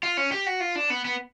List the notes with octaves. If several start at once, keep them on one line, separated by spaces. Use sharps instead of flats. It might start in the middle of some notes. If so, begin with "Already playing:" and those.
F4
C#4
G4
F#4
F4
D4
B3
B3